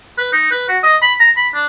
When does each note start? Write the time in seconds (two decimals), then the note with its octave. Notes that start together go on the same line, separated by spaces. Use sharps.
0.18 B4
0.32 D#4
0.51 B4
0.68 F#4
0.83 D#5
1.02 B5
1.20 A#5
1.36 B5
1.54 D4